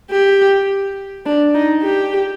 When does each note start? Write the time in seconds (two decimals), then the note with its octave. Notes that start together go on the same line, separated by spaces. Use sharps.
0.11 G4
1.26 D4
1.55 D#4
1.83 G4